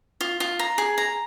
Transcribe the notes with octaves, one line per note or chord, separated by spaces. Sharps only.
F4
F4
A#5
G#4
A#5